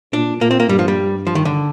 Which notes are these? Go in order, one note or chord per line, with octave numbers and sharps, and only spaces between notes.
A#2 D4
A#2 A#3
C4
A#3
G2 G3
F3
G3
F3
D#3
D3